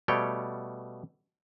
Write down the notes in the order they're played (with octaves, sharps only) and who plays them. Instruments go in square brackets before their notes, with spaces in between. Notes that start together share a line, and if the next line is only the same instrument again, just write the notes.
[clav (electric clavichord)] B2 G3 A3 C#5 G5